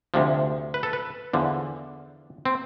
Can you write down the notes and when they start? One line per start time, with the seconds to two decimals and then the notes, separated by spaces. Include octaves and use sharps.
0.14 D2 C3 F3
0.74 B4
0.83 A4
0.93 B4
1.33 E2 D3 F3
2.45 C4